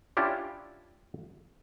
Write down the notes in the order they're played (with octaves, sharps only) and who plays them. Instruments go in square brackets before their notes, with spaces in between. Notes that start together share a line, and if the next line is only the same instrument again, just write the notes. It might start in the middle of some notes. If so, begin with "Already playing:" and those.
[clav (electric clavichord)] C#4 D4 E4 F4 G4 D5